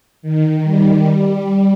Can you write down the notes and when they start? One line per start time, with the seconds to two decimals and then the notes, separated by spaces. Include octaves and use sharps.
0.22 D#3
0.64 G3
1.06 G3